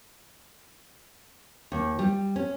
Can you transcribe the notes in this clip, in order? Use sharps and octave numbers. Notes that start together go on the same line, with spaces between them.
D#2
G3
C#4